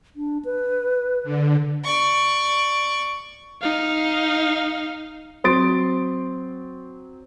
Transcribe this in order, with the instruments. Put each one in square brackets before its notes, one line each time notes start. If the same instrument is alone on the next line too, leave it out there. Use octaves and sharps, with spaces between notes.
[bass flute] D4
B4
[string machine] D3
[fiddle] D5 C#6
[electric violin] D#4 F5
[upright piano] F#3 C4 C6 D#6 A6 D7